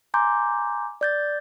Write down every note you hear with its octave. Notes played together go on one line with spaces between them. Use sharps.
G#5 A#5 C6 D6 G6
D5 G6 A6